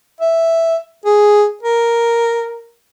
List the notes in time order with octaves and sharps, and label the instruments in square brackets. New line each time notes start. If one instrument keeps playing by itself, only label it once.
[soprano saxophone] E5
G#4
A#4